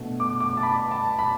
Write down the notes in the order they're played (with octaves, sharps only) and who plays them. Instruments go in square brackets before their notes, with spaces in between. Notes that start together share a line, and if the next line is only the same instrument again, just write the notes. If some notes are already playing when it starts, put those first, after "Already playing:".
Already playing: [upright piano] B2 A3 D4
D6
D6
A5
B5
A5
B5